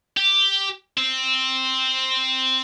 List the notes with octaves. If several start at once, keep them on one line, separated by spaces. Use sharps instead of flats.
G4
C4